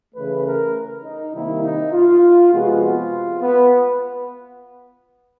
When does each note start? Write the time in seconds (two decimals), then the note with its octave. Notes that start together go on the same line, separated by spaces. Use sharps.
0.15 C#3 E3 A3 B4
0.44 A#4
1.04 D#4
1.33 C3 D#3 G3 A#3 E4
1.64 D#4
1.93 F4
2.53 C3 F3 G#3 B3 F#4
2.83 F4
3.42 B3